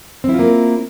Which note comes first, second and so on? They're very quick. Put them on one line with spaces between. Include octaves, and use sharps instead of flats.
C4 E4 F4 A#3